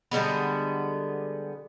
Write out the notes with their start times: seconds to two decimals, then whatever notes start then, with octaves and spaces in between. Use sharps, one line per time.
0.11 D3 G3 G#3 B3